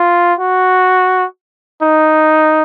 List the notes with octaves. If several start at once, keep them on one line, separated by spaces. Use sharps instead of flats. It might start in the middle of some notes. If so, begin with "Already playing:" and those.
Already playing: F4
F#4
D#4